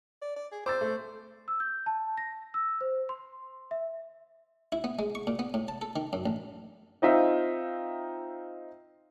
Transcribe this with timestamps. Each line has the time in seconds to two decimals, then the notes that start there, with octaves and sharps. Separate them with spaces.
0.22 D5
0.36 D5
0.52 G#4
0.66 C5 D6 E6 A6
0.81 A3
1.48 E6
1.60 G6
1.86 A5
2.17 A#6
2.54 E6
2.81 C5
3.09 C6
3.71 E5
4.72 E4
4.84 B3
4.99 G#3
5.15 C#6
5.27 A#2
5.39 B3
5.54 A2
5.68 A5
5.82 A4
5.96 D#3
6.13 F#2
6.26 A1
7.02 C4 D#4 F4 E5